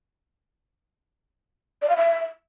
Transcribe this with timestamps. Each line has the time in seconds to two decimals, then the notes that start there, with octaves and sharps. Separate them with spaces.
1.82 D5
1.89 F5
1.97 E5